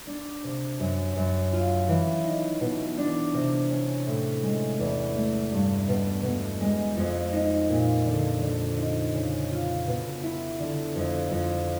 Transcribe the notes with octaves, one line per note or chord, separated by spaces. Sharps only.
D4
C3
F#2
F#2
F4
E3
D#4
B2
D4
C3
C#4
A2
G#3
E2
A3
G2
B2
B2
G#3
F2
D#4
A#2
D3
D3
D#4
C#3
F4
B2
E4
D3
F2
F2